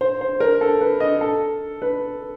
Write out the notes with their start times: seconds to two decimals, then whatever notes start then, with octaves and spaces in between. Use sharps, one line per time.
0.01 C5
0.21 C5
0.40 A#4
0.61 A4
0.81 B4
1.00 D#5
1.21 A4
1.82 B4